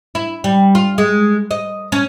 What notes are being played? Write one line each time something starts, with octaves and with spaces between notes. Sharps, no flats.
E4
G3
F4
G#3
D#5
C#4